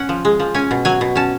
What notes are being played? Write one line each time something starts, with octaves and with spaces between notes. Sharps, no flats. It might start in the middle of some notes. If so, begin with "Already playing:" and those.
Already playing: C#4 F#5
F3
G#3
F3
C#4 G#5
B2
F#3 G#5
B2
C#4 A5